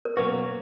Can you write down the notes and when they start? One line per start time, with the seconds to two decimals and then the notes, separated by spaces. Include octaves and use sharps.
0.05 A#4
0.17 B2 F#3 A#3 C#4 F#4 B4